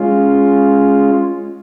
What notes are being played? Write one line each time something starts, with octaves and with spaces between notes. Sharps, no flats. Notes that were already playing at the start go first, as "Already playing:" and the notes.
Already playing: G#3 C#4 F4